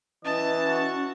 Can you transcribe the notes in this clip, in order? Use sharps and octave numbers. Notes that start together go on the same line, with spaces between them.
E3 C#4 D#5 A5
F#4